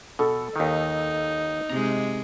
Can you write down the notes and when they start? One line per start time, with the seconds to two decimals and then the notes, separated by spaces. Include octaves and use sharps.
0.19 B2 A4
0.56 D#2 D#3 D#4
1.70 C3 G#3 A#5